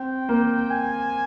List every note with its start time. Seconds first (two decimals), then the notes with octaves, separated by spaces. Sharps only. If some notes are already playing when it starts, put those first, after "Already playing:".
Already playing: C4 G5
0.29 A#3
0.70 G#5